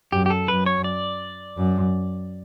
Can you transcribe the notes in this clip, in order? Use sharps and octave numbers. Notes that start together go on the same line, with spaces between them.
F#2 G4
G4
A4
F#2 B4
C#5
D5
F#2